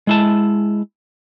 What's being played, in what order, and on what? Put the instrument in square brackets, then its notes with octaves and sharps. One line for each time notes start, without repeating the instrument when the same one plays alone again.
[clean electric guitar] G#3 E4 A5